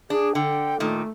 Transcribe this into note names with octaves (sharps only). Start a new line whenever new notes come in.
D4 G#4
D3 G5
A#2 D#3 A3